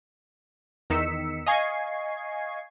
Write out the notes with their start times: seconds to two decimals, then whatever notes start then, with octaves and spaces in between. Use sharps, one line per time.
0.90 E2 D#3 D#4 E6 B6 C#7
1.46 D#5 F5 G#5 C#6 G#6 C7